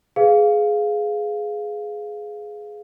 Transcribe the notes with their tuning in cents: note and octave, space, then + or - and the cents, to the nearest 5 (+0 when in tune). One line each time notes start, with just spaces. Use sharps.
G#4 +10 B4 +30 F5 +0